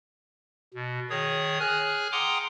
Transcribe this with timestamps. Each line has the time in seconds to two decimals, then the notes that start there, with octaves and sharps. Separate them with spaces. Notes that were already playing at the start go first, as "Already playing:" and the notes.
0.74 B2
1.10 D#3 G#4 C#5 D#6
1.60 G#4 G#5 F6 F#6
2.12 F#5 G5 A#5 C6 D6 D#6